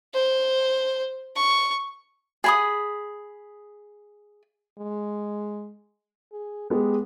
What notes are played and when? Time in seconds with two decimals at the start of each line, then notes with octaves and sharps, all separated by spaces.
0.14 C5
1.36 C#6
2.44 G#4 B5 D#6
4.79 G#3
6.32 G#4
6.70 G#3 B3 G4